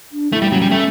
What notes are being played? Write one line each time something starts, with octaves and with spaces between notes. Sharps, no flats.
D4
A3 E4
G3
F#3 C#4
G3
A3